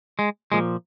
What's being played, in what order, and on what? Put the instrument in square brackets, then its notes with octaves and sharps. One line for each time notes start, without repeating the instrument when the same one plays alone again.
[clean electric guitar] G#3
A#2 F3 G#3